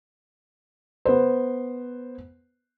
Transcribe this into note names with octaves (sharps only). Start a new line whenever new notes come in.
B3 B4 C5